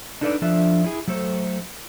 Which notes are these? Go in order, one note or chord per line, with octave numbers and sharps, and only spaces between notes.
D4 D#4 A4 B4 C5 D5
F3 D4 A4 D5 E5
E4 G#4
F#3 A3 A4 C5